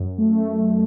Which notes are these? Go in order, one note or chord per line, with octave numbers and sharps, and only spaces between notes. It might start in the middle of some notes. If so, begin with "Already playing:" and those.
Already playing: F#2
A3